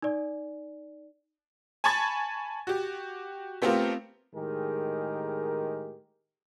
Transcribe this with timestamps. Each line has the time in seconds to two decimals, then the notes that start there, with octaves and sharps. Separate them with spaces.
0.02 D#4 D5
1.84 G#5 A5 B5 C#6 G#6 A6
2.67 F#4 G4
3.62 A3 B3 C4 F4 G4 A#4
4.35 A2 D#3 G#3 G4 G#4 A#4